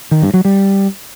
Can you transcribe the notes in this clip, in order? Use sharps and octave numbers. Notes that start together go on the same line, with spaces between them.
D#3
G2
F#3
G3